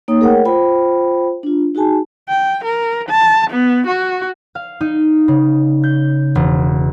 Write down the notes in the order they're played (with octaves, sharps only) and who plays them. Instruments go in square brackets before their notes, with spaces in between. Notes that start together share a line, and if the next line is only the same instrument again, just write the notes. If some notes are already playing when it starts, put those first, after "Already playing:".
[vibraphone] A#3 D#4 C#5 G5 D#6
A3 G#4 A#4 C#5 F#5 G5
F4 C5 G5 B5
D4 F4
D#4 F#4 G#4 G#5 A5
[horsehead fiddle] G5
A#4
A5
B3
F#4
[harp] F5
D#4
C#3
G6
E1